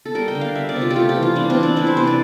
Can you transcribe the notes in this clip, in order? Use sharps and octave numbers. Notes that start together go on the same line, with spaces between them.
A4
G3 A#4
G5
D3
F5
G3 E5
D5
C3
F4
G4
A3 F4
G4
E3
F4
G3 D4
C4
E3
D4
E3 E4
C5
C3 C5
D5